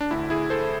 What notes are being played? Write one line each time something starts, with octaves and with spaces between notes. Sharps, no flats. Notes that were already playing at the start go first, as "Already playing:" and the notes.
D4
D2 D3 E4
E4 G#4
A4 C5